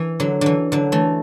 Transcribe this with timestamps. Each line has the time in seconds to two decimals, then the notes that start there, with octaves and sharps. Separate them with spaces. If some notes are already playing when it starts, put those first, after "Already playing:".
Already playing: E3
0.20 D3 F#3
0.41 D3 E3
0.72 D3 F#3
0.92 E3 A3